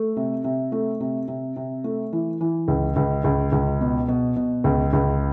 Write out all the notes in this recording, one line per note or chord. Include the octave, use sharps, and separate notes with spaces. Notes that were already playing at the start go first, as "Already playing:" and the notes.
Already playing: A3
C3
C3
A3
C3
C3
C3
A3
E3
E3
C#2
C#2
C#2
C#2
B2
B2
B2
C#2
C#2